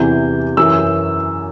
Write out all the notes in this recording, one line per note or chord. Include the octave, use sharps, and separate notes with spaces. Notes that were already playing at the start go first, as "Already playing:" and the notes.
Already playing: E2 C3 E3 G6
F#2 E3 E6